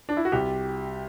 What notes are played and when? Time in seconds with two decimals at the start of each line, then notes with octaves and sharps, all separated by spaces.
0.09 D4
0.17 E4
0.25 F#4
0.32 C2 G4